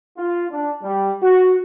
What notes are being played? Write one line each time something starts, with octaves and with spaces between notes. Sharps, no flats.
F4
D4
G3
F#4